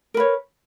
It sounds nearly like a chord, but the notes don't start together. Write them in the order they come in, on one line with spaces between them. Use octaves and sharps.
A#4 B4 C#5